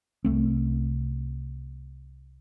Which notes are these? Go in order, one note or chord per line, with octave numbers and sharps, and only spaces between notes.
C2 A3 C4